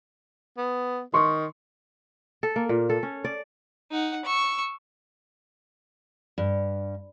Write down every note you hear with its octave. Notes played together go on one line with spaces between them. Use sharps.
B3
D#3 C6 C#6
A4
A#3
A#2
A4
C#4
D5
D#4 F#5
C#6 E6
G2